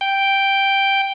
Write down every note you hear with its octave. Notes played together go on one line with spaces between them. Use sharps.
G5